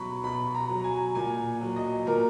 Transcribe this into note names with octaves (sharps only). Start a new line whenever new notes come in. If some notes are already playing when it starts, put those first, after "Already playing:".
Already playing: B2 F#3 B5 C#6
B2 B5
A#5
F#3
G#5
A#2 G#5
F#3
D#5
A#2 A#4